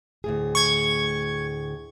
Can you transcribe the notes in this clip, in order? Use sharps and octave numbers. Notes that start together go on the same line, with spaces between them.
D2 A2 G#4
C#6 G#6